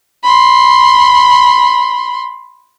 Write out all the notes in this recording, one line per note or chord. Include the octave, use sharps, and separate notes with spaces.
B5 C6